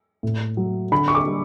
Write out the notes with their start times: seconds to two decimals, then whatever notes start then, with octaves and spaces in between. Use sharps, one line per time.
0.23 A2
0.57 F#3
0.92 D3 B5
1.08 C#6
1.15 D6
1.26 G3